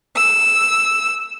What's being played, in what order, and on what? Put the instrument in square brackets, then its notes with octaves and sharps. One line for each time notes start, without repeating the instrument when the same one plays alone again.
[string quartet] E6